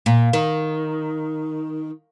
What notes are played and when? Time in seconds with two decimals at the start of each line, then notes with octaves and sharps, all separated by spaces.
0.06 A#2
0.33 D#3